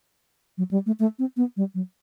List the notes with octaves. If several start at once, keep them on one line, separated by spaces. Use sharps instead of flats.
F#3
G3
A3
A3
C4
B3
G3
F#3